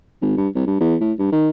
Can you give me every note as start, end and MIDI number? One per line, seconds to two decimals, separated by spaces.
0.22 0.34 32
0.37 0.48 43
0.55 0.64 36
0.67 0.78 43
0.80 0.95 40
1.01 1.12 45
1.19 1.31 43
1.32 1.49 51